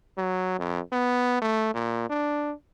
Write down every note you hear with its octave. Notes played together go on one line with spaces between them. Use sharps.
F#3
F2
B3
A3
A#2
D4